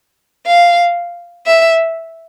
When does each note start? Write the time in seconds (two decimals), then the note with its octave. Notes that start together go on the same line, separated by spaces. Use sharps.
0.47 F5
1.46 E5